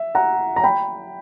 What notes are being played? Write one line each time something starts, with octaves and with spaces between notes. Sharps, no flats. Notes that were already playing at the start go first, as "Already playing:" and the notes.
Already playing: E5
F#5 A#5
A#5
G5 B5